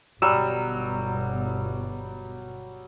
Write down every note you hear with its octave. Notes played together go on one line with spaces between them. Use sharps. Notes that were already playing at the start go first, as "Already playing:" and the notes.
G1 B2 F#3 G3 E6